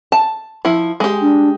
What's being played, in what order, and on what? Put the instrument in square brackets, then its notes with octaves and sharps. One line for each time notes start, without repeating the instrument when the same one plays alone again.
[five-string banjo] A5
F3 E4
G#3 G4
[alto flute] D4